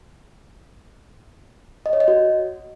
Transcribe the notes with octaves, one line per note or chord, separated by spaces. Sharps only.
D#5
C#5
D#5
F#4